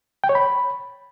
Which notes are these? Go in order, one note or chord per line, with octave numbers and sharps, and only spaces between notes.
G5
C#5
B5